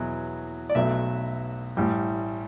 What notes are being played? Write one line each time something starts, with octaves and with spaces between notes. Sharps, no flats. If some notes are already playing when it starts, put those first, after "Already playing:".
Already playing: E2 B2 F#3
D5
B1 B2 F#3 A3 E5
A1 A2 G3